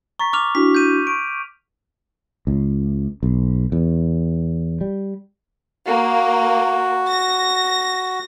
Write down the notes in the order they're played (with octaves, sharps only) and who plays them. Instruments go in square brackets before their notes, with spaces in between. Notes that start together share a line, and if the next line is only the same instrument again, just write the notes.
[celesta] A#5 A6 B6 [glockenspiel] C#6
[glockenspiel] D6 F6 F7
[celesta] D4 E4 F#4 [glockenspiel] B6
[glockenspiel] G6 D#7
[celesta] C#6 [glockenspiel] D7
[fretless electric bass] C#2
B1
E2
G3
[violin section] A#3 [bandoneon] F#4
[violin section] A#6